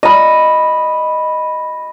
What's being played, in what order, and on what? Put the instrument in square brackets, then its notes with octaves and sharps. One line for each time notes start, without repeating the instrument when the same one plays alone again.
[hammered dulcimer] D#5 B5